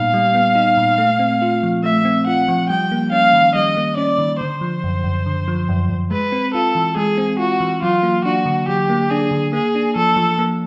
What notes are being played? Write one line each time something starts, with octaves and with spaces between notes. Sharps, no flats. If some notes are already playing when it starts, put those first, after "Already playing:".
Already playing: A#2 G3 B3 D#4 F5
G3
B3
D#4
A#2
A3
C4
F4
F3
A3 E5
C4
F4 F#5
F3
G3 G5
A#3
C#4 F5
D#3
G3 D#5
A#3
C#4 D5
D#3
D3 C5
F3
F#2
F#2
D3
F3
F#2
F#2
G#3 B4
C4
F4 A4
E3
G#3 G#4
C4
F4 F#4
E3
F#3 F4
A#3
D4 F#4
D3
F#3 G4
A#3
D4 G#4
D3
A#3 G#4
D4
F3 A4
F3
A#3